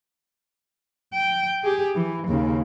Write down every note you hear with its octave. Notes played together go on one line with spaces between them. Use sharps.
G5
G4 G#4
E3
D#2 C#3